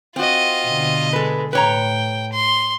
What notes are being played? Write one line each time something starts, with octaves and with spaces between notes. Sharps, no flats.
C4 F4 F#4 D#5
B2 D3
G#3 A4 B4
A2 B4 C#5 G5 A#5
C6